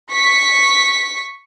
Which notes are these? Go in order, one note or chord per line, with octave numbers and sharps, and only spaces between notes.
C#6 B6